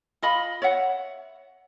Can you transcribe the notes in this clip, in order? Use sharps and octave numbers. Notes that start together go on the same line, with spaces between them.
F4 D#5 B5
C#5 E5 F#5